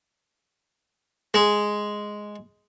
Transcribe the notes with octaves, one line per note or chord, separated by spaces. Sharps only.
G#3